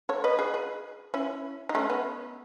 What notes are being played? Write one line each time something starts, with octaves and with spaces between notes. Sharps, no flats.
A4 C#5
B4 D#5
G#4 B4
G#4 B4
C#4 E4
D#4
A3 C#4
B3